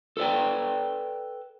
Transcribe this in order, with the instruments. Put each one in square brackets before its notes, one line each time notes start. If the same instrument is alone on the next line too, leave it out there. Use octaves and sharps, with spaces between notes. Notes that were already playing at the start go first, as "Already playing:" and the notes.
[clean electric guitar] A4 B4 D5 G5